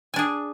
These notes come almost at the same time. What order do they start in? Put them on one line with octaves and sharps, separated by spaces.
G#5 D4 G#4